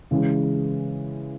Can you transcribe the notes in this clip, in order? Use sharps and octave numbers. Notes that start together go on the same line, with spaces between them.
C#3 E3 G#3